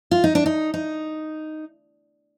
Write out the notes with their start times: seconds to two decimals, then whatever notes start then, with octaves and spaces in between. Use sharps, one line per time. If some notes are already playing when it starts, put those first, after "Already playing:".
0.11 F4
0.24 D#4
0.35 D4
0.46 D#4
0.74 D#4